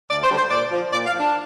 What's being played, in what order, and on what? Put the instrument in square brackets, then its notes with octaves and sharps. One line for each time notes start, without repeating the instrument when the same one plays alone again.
[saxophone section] D2 D5
C5
D3 G3
C5
A#2 D5
F3
A#2 D5
F5
F3
D4